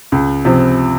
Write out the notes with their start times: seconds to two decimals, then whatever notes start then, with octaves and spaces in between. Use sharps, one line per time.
0.12 C#2
0.45 C3 F3